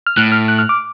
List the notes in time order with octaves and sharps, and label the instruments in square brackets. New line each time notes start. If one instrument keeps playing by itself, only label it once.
[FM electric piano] F6
[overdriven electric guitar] A2 [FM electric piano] F#6
[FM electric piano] F6
F#6
F6
D6